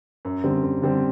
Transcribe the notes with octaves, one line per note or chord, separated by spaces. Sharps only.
F#2
D3 G3 C4
F#2
D3 G3 C4